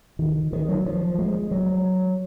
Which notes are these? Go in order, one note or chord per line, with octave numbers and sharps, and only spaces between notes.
D#3
D#3
F#3
F3
G#3
F#3